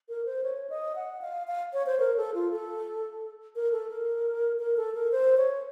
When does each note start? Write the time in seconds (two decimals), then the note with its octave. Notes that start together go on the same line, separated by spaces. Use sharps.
0.09 A#4
0.26 C5
0.43 C#5
0.70 D#5
0.96 F#5
1.21 F5
1.47 F5
1.73 C#5
1.86 C5
2.00 A#4
2.17 A4
2.34 F4
2.52 A4
3.56 A#4
3.72 A4
3.90 A#4
4.59 A#4
4.77 A4
4.95 A#4
5.12 C5
5.37 C#5